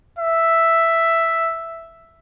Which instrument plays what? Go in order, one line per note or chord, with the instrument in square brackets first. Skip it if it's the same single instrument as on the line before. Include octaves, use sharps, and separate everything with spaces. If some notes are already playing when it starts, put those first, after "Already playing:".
[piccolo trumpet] E5